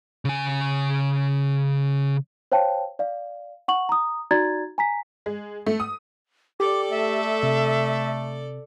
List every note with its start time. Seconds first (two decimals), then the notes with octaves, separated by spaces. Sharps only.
0.25 C#3 G#5
2.52 C5 C#5 F5 G5 A5
2.99 D5 F5
3.68 F#5 C#6 F#7
3.89 A#5 D#6
4.31 D#4 F#4 D5 A#5 G#6 A6
4.78 G#5 A#5 B6
5.26 G#3
5.66 A3
5.80 D#6
6.60 G4 A4 D5 D6
6.90 A3 E5
7.43 C3